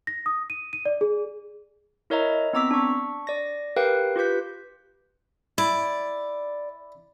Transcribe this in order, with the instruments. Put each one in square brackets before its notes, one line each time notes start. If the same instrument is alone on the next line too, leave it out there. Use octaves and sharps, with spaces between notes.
[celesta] A#6
D#6
D#7
D#7
D5
G#4
[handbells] E4 A#4 C#5 D#5 E5 A#5
B3 C4 A#5 D6 E6 B6
D4 C#6
D5 A#6
G4 A#4 B4 F5 G5 F#6
F4 G4 B4 G6 B6
[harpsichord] E4 [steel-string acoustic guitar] D5